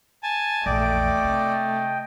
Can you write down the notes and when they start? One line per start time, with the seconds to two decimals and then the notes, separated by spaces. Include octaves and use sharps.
0.23 G#5 A5
0.66 A#1 E2 A3 D5 D#5 G5
1.24 C3